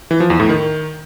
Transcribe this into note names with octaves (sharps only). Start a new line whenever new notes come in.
E3
F3
E2
A2
D#3